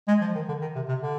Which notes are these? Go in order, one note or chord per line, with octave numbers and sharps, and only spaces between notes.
G#3
F3
D#3
D3
D#3
C3
C3
D3